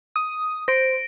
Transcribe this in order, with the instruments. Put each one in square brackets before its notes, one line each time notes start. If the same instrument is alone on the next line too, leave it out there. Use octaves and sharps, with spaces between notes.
[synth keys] D#6
[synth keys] C5 [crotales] A#6 D7